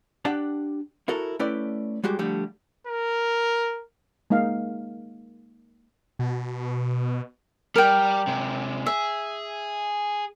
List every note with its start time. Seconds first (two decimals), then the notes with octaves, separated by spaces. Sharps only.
0.25 D4 G4 F#5 G5 A5
1.08 E4 F#4 A4 A#4
1.39 A3 C#4 E4 B4 D5 G5
2.04 G3 G#3 F#4 G4
2.19 D3 F3 G3 A3 G4
2.87 A#4
4.30 G#3 A#3 D#4 F5
6.19 B2
7.76 G3 A#4 G5
8.27 C3 G#3
8.86 G#4 E5